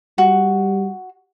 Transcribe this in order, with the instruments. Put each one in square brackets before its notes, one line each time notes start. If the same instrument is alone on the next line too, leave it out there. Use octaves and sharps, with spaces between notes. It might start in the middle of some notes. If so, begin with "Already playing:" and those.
[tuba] G3 [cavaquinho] F#4